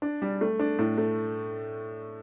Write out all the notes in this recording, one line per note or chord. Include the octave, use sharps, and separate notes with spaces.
D4
G3
A3
D4
A2
A3